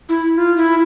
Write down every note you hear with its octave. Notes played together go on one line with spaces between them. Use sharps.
E4
F4
E4